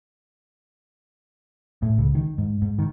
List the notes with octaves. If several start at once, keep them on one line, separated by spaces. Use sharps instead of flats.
A2
C#2
D#3
G#2
G#2
D#3